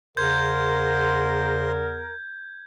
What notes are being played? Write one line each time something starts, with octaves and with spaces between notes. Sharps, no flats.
E2 C#3 A#4 C5 C6 G6 G#6